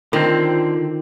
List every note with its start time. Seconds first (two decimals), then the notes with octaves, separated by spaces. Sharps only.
0.13 D3 D#3 C4 F4